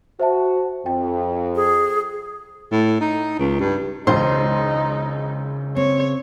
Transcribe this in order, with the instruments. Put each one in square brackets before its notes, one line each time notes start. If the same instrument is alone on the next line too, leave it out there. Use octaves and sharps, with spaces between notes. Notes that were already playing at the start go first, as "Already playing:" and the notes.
[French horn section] F#4 [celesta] C5 E5 A5
[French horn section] F2 [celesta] G5
[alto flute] G#4
[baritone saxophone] A2
D#4
C#2
G2
[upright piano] E1 C#2 C6 [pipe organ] C#3 [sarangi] D#4 [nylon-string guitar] C5
[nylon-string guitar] C4 [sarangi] C#5